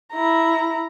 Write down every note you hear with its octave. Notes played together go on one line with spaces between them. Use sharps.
E4 A#5